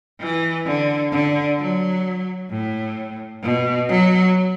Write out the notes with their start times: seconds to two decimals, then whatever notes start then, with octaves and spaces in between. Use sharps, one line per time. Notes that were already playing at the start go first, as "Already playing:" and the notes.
0.20 E3
0.65 D3
1.12 D3
1.58 F#3
2.50 A2
3.43 B2
3.88 F#3